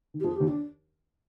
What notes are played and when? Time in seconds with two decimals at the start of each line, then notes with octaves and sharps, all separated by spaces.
0.14 D#3
0.20 G4
0.24 F2 F3 G#4
0.36 D#2 D#3 G4
0.48 D4